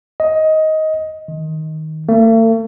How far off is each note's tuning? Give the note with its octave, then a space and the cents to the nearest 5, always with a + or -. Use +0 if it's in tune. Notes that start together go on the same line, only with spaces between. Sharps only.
D#5 +15
D#3 +10
A3 +45